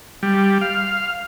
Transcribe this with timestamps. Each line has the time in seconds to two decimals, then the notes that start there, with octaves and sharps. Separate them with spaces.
0.23 G3
0.61 F5